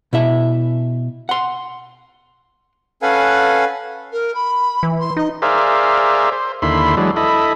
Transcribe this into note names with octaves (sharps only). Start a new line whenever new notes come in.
B2 E4 E5
F#5 C6
C#4 A4 B4 F5 F#5 G#5
A#4
B5
E3
C6
D#4 D#5
G#4 A#4 C5 D5 E5 F5
C5
D#2 D3 E4 B5 C6
E3 F#3 G#3 D4
E4 A4 D#5 B5